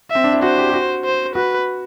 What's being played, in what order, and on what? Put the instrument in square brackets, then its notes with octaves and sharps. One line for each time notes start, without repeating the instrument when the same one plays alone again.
[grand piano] C4 [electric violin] E5
[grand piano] D4
E4
[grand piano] F#4 [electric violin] C5
[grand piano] G4
G4
F#4
[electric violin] C5
[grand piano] F#4 [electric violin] B4